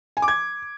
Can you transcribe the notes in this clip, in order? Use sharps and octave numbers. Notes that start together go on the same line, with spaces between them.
G#5
D6
G#6